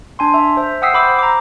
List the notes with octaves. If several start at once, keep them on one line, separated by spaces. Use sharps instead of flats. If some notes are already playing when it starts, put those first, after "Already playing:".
D4 G#5 C6
E5
C5 E5
F#5 G5 D#6 E6 B6 C7
C5 B5 D6 E6
A#5 D6